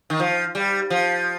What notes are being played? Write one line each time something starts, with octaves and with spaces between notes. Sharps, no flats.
D#3
F3
G3
F3